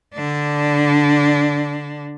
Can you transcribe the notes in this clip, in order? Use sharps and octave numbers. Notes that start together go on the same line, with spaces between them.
D3 D4